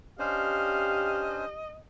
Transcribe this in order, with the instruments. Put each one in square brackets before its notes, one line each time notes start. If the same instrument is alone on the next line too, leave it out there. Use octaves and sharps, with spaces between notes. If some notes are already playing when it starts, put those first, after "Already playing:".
[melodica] C#4 D4 C5 [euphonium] G4 [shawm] D#5 [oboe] F5